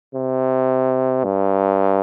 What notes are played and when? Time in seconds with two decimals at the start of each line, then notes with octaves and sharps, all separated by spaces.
0.15 C3
1.24 G2